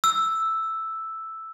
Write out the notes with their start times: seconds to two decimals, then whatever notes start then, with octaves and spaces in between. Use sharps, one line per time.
0.04 E6